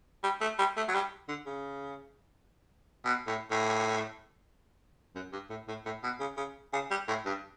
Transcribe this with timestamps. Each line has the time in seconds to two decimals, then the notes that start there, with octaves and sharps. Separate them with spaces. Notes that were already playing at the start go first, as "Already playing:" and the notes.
0.23 G3
0.41 A3
0.59 G3
0.77 A3
0.88 F#3
0.94 G3
1.28 D3
1.46 C#3
3.05 B2
3.27 A2
3.51 A2
5.15 F#2
5.32 G2
5.50 A2
5.68 A2
5.86 A2
6.03 B2
6.20 C#3
6.37 C#3
6.73 C#3
6.91 G3
7.08 A2
7.26 G2